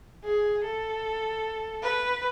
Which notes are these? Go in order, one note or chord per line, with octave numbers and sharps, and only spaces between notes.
G#4
A4
B4